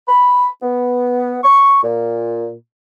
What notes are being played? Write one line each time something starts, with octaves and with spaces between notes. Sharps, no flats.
B5
B3
C#6
A#2